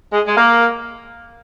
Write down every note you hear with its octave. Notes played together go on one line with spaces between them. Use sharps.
G#3
G#3
A#3